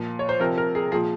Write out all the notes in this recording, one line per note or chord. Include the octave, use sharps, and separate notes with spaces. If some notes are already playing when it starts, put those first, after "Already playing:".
Already playing: A#2 F3
C#5
C5
C3 F3 A#4
A#4
G#4
A#2 F3 G#4